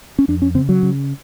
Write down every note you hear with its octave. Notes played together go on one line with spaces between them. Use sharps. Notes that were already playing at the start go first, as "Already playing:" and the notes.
C#4
F2 D4
C#4
C#3 C4
F#3
C#3